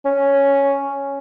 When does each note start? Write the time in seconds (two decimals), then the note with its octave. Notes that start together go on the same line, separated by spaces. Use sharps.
0.05 C#4